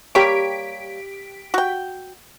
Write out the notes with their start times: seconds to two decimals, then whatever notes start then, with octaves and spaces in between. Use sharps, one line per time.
0.15 G3 A#3 G4 C#5 B6 D7
1.54 F#4 G5